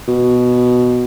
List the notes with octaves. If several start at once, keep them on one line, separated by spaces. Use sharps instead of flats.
B2